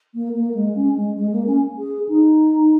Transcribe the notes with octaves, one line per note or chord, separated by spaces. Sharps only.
A#3
A#3
G#3
C#4
G#3
G#3
A#3
C#4
G#4
D#4